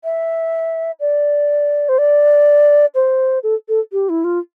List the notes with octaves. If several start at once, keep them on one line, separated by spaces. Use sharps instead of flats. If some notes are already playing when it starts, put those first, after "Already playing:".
E5
D5
C5
D5
C5
A4
A4
G4
E4
F4